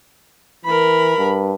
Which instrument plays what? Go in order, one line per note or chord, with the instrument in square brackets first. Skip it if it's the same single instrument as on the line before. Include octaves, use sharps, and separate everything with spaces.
[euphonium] E3 [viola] A#4 B5
[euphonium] G2